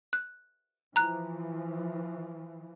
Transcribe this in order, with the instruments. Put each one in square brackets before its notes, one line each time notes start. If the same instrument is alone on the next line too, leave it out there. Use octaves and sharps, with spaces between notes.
[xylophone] F#6
[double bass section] E3 F3 [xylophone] A#5 F#6